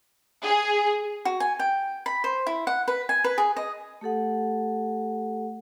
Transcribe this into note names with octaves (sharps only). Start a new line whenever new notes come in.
G#4
F#4
G#5
G5
B5
C5
E4
F#5
B4
G#5
B4
G#4
D#5
A3 G4 A4 F#5